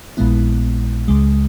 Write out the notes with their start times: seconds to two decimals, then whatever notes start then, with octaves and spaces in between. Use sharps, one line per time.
0.17 A#1 A#2 G#3 B3 E4
1.08 C#2 C#3 G#3